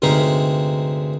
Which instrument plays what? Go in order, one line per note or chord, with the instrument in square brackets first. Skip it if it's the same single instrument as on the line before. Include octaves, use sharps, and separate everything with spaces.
[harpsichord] D2 G2 C3 G#3 D#4 F5